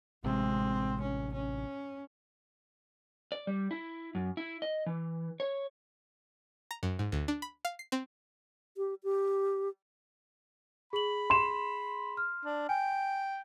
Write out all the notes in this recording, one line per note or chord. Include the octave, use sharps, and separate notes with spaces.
A1 C3 G#3 C4
C#4
C#4
D5
G3
E4
F#2
E4
D#5
E3
C#5
A#5
F#2
G#2
D2
D4
B5
F5
C7
C4
G4
G4
G#4 B5 F#7
C6 E7
F6
D4
G5 G#5